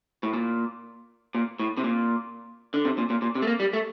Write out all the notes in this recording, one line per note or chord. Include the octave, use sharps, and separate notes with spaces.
A2
A#2
A#2
A2
C3
A#2
D3
C3
A#2
A#2
A#2
C3
A3
A#3
G3
A3